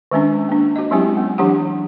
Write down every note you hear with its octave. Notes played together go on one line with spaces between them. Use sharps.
D#3 G#3 C#4 D4
A#3 D4
F#4 D#5
F#3 G#3 C4 C#4 E4 G4
B3
E3 F#3 D4 G4 F#5